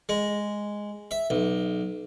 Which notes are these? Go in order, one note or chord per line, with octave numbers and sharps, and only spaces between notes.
G#3
E5
B1